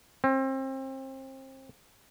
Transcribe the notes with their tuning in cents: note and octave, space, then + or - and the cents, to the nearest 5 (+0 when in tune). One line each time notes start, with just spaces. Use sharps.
C4 +30